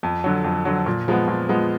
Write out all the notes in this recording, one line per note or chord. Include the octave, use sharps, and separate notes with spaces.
F2
D3 F#3
F2
D3 F#3
A#2
F3 G#3 B3
A#2
F3 G#3 B3